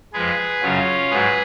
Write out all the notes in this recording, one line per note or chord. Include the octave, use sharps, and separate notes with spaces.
F2 F3 G#3 G#4 B4
F#2 C#3 F#3 C#4 F4
G#2 F#3 G#4 B4